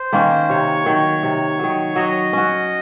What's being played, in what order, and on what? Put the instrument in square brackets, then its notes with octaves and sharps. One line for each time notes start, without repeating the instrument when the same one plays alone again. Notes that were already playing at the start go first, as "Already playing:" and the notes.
Already playing: [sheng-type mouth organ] C5
[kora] D#3 A#3 C#4
[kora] C3 [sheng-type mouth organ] C#5
[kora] D#3 F#3
C3
D#3 F#3
[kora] F#3 [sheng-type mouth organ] D#5
[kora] C#4 F#4